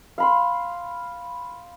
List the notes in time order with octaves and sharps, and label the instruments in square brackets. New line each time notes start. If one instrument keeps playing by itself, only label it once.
[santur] F5 B5 C6